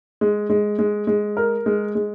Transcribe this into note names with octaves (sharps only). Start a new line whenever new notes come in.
G#3
G#3
G#3
G#3
A#4
G#3
G#3